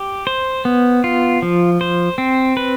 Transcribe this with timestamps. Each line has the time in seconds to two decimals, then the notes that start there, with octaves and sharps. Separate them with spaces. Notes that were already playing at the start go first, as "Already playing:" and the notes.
Already playing: G4
0.27 C5
0.65 B3
1.04 F4
1.42 F3
1.81 C5
2.18 C4
2.57 B4